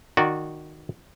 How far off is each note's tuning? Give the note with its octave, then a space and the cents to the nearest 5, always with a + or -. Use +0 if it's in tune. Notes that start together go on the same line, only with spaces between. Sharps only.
D#3 -15 F#4 -15 D5 +0